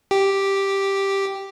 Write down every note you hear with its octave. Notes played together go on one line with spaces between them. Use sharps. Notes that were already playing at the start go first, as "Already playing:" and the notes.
G4